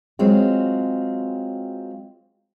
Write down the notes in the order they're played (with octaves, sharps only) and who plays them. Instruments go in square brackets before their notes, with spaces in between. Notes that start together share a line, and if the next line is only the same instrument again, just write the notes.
[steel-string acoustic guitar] F#3 G#3 C4 F4